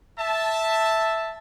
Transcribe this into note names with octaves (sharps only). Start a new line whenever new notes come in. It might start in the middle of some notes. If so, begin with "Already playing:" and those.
E5 A5